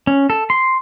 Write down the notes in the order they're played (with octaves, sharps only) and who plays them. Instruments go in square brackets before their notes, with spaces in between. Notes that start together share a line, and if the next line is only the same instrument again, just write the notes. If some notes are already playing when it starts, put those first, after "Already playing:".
[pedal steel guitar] C#4
A4
C6